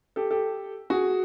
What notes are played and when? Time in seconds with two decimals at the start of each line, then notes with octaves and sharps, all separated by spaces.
0.16 G4 A4
0.31 G4 A4
0.90 F#4 G#4